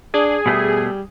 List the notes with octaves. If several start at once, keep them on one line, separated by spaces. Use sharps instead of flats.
D4 G#4
B2 G3 A3